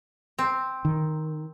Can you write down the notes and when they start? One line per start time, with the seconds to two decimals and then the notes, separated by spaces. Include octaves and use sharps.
0.39 C4
0.85 D#3